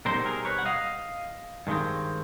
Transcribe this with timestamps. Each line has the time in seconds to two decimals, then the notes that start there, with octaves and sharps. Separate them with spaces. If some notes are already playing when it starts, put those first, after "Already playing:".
0.05 B2 G3 C4 D#4 A#4 C5
0.26 G#4 A#4
0.45 B4 C#5
0.59 F#5
0.66 D#5 F5
1.67 G2 D#3 G#3 C4